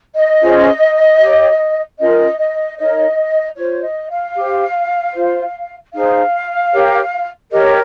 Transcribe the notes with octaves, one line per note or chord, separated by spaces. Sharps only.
D#5
C#4 F4 G#4 C5
G4 C#5
C#4 F4 A#4 D#5
D#5
D#4 A#4 C#5 D#5
F4 C5 C#5
D#5
F5
G4 C5
F4 C5
D#4 G#4 C5 F5
G4 A#4 C#5
G4 A#4 C#5 D#5